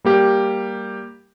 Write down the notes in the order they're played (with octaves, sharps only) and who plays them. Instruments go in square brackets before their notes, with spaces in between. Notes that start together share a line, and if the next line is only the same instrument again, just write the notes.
[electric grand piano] G3 A#3 G4